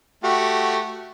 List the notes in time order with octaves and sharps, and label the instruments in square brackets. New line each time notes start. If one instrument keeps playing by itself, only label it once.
[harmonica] A3 F#4 G4